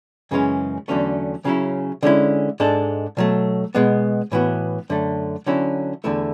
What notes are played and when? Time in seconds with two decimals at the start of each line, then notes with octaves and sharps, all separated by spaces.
0.31 F#2 C#3 E3 G#3 C#4
0.88 E2 D3 F#3 A3 C#4
1.45 C#3 F#3 C#4 E4
2.03 D3 G#3 C#4 E4
2.60 G#2 G#3 D4 A4
3.17 B2 F#3 A3
3.75 B2 G#3 B3
4.32 A2 E3 B3 F#4
4.90 F#2 D3 A3
5.46 D3 F#3 C#4 E4
6.04 E2 D3 A3 E4